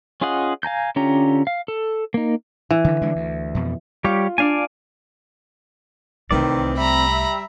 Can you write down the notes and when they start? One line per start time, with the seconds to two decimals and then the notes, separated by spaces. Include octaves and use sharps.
0.21 C#4 F4 G#4 D#5 F#5
0.63 F5 G#5 A#5 G6
0.96 D3 C#4 F4 G4 A#5
1.47 F5
1.68 A4
2.14 A#3 D#4
2.71 E3
2.84 D3 D#3
3.02 D3 G#3 D4
3.16 D2
3.55 F2 B2
4.04 G3 F4 G4 C#5
4.38 D4 D5 F5 G#5
6.31 C2 D#3 E3 A3 C4 D5
6.77 G3 E5 A#5 B5